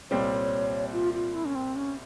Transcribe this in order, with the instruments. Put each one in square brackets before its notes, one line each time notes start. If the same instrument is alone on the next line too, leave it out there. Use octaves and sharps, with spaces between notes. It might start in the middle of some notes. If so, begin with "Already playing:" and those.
[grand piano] C2 A#2 G3 C4 [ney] C#5
[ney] F4
F4
E4
C#4
C4
C#4